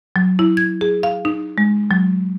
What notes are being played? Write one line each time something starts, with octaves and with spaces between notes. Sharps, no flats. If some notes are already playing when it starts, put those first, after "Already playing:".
F#3
E4
G#6
G#4
F5
D#4
G#3
F#3